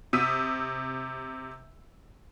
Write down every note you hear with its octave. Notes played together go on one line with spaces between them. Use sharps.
C3 D#6 E6 B6 D#7